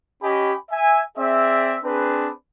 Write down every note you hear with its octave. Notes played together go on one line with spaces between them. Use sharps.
C#4 G4 D#5 G#5 B5
E5 G#5
C4 G#4 D5 E5
C4 D4 G#4 B4